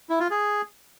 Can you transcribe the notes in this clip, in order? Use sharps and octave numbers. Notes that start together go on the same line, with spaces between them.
E4
F4
G#4